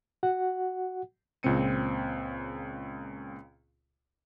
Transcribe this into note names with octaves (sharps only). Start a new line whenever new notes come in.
F#4 F#5
C#2 A#2 C#3 C4 C#7 D#7